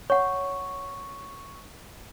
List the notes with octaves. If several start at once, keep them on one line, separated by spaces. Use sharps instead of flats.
C#5 F#5 C#6